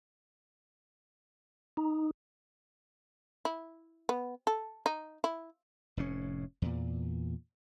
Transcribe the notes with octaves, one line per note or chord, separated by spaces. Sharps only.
D#4
E4
B3
A4
D#4
E4
F1 A2 C#4
E2 A#2